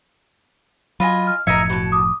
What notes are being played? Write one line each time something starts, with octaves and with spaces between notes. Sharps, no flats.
F#3 F4 D#5 G#5 B5
F6
F#1 A2 F3 A#4 D#5 E5 G#6 C#7
B2 A5
D6 D#6